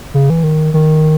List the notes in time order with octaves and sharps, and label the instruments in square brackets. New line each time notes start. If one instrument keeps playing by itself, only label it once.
[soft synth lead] C#3
E3
D#3
D#3